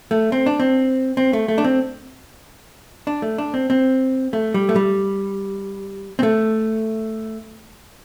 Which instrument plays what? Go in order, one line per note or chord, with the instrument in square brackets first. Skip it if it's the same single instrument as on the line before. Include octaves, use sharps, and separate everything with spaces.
[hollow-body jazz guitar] A3
C4
D4
C4
C4
A3
A3
D4
C4
D4
A3
D4
C4
C4
A3
G3
A3
G3
C4
A3